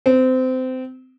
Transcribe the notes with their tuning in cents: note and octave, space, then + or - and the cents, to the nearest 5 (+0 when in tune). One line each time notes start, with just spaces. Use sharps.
C4 -25